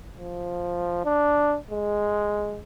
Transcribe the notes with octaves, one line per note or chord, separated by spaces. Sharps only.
F3
D4
G#3